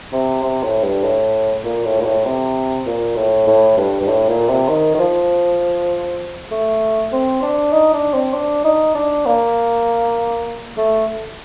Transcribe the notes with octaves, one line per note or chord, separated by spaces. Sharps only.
C3
C3
A2
G2
A2
A#2
A2
A#2
A2
C3
A#2
A2
A2
G2
G2
A2
A#2
C3
D#3
D#3
F3
A3
C4
D4
D#4
D4
C4
D4
D#4
D4
A#3
A3